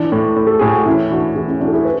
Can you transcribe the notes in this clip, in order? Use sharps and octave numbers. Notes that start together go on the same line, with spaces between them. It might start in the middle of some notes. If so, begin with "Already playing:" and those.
Already playing: E3 D4
A2
A2
A4
A2 G#4
F#4
E3 C#4 E4
E3 D4 F#4
E3 E4 G#4
C#4 E4
E3 D4 F#4
A4
E4 G#4
B4